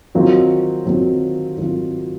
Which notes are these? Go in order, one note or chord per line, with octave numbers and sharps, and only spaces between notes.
D#3 F#3 C4 F4
D#3 F#3 C4 F4
D#3 F#3 C4 F4